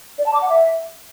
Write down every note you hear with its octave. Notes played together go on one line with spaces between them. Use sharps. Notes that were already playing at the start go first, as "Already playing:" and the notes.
D5
A5
D6
F#5
E5